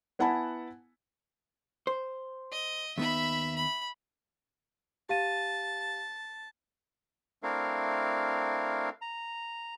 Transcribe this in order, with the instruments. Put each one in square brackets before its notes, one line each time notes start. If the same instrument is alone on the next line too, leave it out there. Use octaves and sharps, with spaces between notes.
[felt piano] B3 E4 F#5 G#5 A5 B5
[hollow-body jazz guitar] C5
[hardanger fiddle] D#5
[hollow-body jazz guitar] D#2 B3 D#4 [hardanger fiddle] E5 B5
[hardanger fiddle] B5
[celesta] G4 F5 D#7 [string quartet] A5
[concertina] A3 C4 D4 E4 A#4 F5
A#5